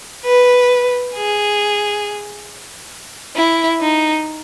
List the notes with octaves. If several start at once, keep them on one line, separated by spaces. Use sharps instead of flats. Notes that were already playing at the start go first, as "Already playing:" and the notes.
B4
G#4
E4
D#4